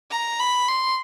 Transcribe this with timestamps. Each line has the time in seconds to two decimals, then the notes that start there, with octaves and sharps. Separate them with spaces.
0.11 A#5
0.40 B5
0.68 C6